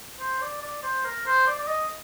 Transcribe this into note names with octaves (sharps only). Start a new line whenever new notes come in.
C5
D5
D5
C5
A#4
C5
D5
D5
D#5